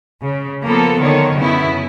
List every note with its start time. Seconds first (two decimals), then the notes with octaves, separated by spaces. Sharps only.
0.23 C#3
0.64 F3 A#3 B3 A4
1.00 D3 D#3 C#5
1.35 F#2 C#3 B3 E4